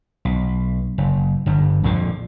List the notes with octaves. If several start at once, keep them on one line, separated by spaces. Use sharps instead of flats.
B1
F#1
G1 G2
A#1 F2 D3 F3